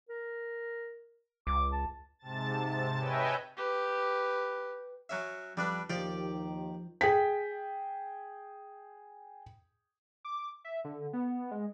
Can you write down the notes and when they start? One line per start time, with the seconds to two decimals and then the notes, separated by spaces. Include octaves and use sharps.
0.10 A#4
1.47 C#2 D6
1.72 A5
2.19 G#2 C3 A5 A6
2.99 B4 C#5 D#5 E5 G5 G#5
3.57 G4 B4
5.09 F#3 C#4 E5
5.57 F2 G3 D4 B4
5.90 D#2 D#3 F3 G4 D5
7.01 G#4 G5 B6
10.25 D6
10.64 E5
10.84 D3
11.13 B3
11.51 G#3